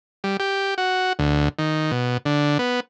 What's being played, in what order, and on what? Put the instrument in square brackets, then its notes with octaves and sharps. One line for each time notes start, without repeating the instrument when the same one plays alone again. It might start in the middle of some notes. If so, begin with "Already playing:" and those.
[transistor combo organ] G3
G4
F#4
D2
D#3
B2
D3
B3